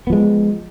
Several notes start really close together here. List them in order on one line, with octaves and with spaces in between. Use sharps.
B3 F3 G#3